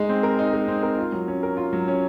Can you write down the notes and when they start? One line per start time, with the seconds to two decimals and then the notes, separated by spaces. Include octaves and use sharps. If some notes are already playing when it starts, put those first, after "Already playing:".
Already playing: G#3 D#4
0.09 C4
0.23 A#4
0.39 D#4
0.53 G#3
0.68 C4
0.83 A#4
0.98 F4
1.12 F#3
1.28 C#4
1.43 A#4
1.57 F4
1.73 F#3
1.88 C#4